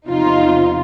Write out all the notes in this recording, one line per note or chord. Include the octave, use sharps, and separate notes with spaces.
E2 C3 F3 D#4 F4